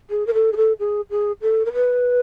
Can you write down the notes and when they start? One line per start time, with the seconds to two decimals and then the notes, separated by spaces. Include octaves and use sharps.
0.10 G#4
0.27 A#4
0.34 A4
0.53 G#4
0.57 A4
0.79 G#4
1.10 G#4
1.42 A4
1.65 A#4
1.73 B4